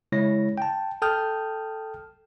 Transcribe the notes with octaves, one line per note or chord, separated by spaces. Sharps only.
C#3 G#3 E4 C#5 A#6
G5 A5
A4 G5 A5 D#6 F6 G6